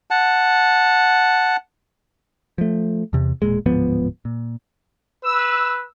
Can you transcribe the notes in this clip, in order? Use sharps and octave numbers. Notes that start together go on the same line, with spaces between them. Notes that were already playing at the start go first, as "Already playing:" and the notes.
F#5 A5
F3 A3
E2 C3
E1 D#2 A#2 G#3
D1 G#2 F3 B3
A#2
B4 E6